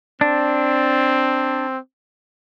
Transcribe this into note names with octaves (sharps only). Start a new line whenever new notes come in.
C4 D4